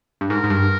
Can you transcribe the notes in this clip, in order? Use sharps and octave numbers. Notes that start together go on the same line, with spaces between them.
G2
G#2 A#4
G#2
G2